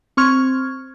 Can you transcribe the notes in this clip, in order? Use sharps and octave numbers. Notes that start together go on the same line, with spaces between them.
C4 C#6 F6 G#6